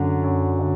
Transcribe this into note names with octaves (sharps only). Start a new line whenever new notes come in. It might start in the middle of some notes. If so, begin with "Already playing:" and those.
Already playing: F#2 D3 F#3
F#2
D3